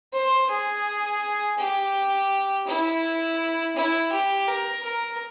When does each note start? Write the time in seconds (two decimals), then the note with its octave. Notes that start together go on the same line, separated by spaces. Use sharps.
0.13 C5
0.49 G#4
1.58 G4
2.67 E4
3.76 E4
4.12 G4
4.48 A#4
4.85 A#4